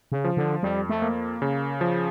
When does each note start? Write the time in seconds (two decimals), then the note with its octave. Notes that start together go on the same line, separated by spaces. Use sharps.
0.12 C#3
0.24 F3
0.37 D3
0.63 F2 G3
0.89 A3
1.02 A#3
1.42 C#3
1.81 F3